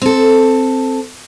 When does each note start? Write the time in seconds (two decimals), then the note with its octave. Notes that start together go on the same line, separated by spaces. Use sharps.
0.02 C4 A4